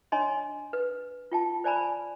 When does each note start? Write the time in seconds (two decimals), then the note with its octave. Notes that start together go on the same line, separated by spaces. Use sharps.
0.12 D4 C#5 D#5 G#5 A#5 C6
0.73 B4
1.32 F4 G5 A5
1.64 C5 D5 G#5 A#5 B5